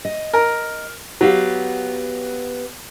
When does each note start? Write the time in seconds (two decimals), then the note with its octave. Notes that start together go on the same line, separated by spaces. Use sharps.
0.05 D#5
0.33 A#4
1.21 F#3 B3 G4 F5